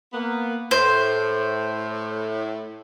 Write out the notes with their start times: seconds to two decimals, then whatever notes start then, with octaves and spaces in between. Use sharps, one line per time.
0.13 A#3 B3
0.71 A2 C5